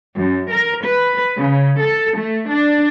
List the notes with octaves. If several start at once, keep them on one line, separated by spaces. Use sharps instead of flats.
F#2
A#4
B4
C#3
A4
A3
D4